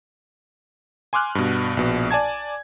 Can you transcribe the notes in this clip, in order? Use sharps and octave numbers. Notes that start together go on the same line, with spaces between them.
G#5 C6 D6 F6 F#6
G2 B2
A#1 B2
D5 G#5 A5 G#6